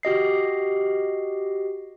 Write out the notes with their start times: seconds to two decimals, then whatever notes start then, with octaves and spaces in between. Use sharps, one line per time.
0.03 F#4 G4 D#5 C7